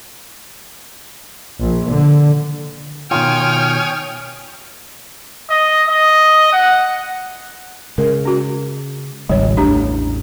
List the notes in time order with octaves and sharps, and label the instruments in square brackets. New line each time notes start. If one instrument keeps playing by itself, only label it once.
[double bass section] A#1
D3
[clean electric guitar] B2 D#3 F4 [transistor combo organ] C#5 G#5 D#6 [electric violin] G5 F6
[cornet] D#5
D#5
F#5
[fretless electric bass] C#3 G#3 [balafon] A#4
[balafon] C#4 F#4
[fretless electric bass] G#1 C#2 [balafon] G3 C#5
[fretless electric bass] A1 E2 A2 [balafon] D4 G4 A#5